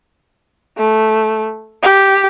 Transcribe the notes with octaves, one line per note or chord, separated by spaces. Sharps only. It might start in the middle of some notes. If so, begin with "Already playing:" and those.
A3
G4